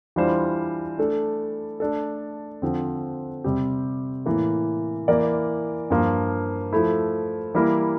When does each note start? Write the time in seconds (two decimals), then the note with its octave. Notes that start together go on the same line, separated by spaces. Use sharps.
0.16 E3 G3 D4 F4 C5
0.98 A3 D4 A4
1.80 A3 D4 A4
2.62 D3 F3 C4
3.44 C3 G3 C4 G4
4.26 A2 E3 A#3
5.08 E3 A#3 E4 A#4 D5
5.90 G2 F3 A#3 F4
6.73 F3 A3 E4
7.54 E3 G3 A#3 E4 A#4